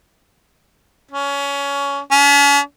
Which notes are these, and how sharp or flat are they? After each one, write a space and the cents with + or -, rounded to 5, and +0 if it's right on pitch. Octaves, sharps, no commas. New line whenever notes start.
C#4 +20
C#4 +40